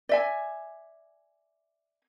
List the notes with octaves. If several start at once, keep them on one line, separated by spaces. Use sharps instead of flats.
D5 E5 G#5